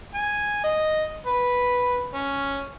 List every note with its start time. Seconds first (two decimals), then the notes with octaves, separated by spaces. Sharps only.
0.15 G#5
0.64 D#5
1.27 B4
2.15 C#4